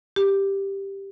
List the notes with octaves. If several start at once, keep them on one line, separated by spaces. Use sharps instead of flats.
G4